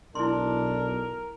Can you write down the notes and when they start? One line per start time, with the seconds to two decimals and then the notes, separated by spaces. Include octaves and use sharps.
0.15 B1 D4 E4 A#4 C6